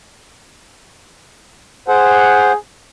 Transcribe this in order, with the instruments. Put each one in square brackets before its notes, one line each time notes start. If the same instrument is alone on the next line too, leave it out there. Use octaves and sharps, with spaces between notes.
[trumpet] G#4 [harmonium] C5 F#5